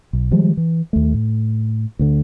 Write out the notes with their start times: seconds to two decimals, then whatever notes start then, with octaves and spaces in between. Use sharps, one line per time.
0.13 B1
0.31 D#3 F3 G3 G#3
0.57 E3
0.93 D#2 A3
1.14 A2
1.99 D2 D3